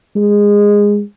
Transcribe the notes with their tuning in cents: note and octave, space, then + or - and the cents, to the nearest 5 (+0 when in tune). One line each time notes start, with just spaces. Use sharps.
G#3 -15